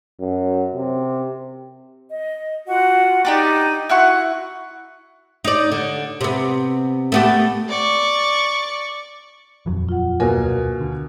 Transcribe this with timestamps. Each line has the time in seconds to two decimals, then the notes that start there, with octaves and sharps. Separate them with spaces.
0.20 F#2
0.75 C3
2.09 D#5
2.67 F4 F#4 F#5
3.25 D4 D#4 G4 D5 A#5
3.89 E4 F#4 F#5 C#6 F#6
5.44 D#4 D5
5.72 D3
6.21 C3 B3
7.12 A3 B3 G4
7.69 D5 C#6
9.66 D#1 F2 F#3
9.89 F4 F#5
10.20 D2 B2 A#3 A#4 G#5
10.81 D3